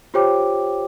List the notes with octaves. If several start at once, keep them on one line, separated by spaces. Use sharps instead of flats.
F4 G4 C5 C#5 G5 D6